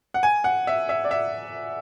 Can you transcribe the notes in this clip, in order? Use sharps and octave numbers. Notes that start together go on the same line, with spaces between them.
F#5
G#5
F#5
E5
E5
D5
E5